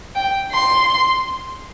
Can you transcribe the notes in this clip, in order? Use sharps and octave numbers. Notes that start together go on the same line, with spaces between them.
G5
C6